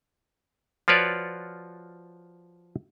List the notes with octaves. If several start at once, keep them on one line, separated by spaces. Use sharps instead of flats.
F3 F4 F#4 B4 C#5 D5